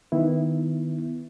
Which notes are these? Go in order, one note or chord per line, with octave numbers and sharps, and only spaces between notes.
D#3 B3 E4